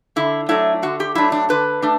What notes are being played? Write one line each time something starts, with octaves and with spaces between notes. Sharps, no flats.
D3 E4
F#3 A3 D4 E4
D3 F#4
G4
F#3 A3 D4 E4
D4
D3 B4
A3 D4